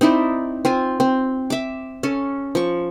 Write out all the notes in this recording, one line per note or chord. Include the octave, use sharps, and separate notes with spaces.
C4 D#4 E4 D5
C4 F4 G#5
C4
E5 D6
C#4 A4
F3 C#6